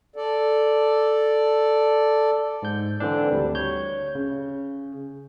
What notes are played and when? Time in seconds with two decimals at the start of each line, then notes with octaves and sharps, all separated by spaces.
0.16 A4 D5
2.62 G#2 G6
3.00 D3 E3 C4 D4
3.32 D2 G3
3.55 C#5 G6
4.15 C#3